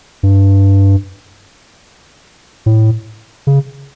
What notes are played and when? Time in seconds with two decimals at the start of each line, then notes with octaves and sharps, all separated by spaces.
0.23 G2
2.66 A2
3.47 C#3